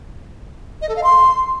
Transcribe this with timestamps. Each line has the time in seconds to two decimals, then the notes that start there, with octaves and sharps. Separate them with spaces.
0.81 D#5
0.89 A4
0.96 F5
1.03 C6